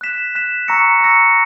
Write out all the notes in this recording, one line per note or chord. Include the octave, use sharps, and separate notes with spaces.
F#6 B6 E7
F#6 B6 E7
A#5 C#6 E6 A#6 C#7
A#5 C#6 E6 A#6 C#7